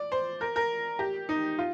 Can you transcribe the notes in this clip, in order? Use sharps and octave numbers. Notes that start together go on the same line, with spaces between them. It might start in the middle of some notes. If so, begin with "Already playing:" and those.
Already playing: D5
C5
A#4
A#4
G4
D#4
F4